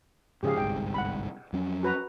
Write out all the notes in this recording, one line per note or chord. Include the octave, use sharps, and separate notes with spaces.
G#2 C#3 F3 G4 G#4 F5
G1 C2 G#2 G5
F#5 B5
F2 F#3 C#4
F#4 B4 A#5